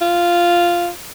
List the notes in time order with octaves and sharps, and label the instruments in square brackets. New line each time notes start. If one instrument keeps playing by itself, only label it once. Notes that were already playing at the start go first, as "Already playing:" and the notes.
[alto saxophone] F4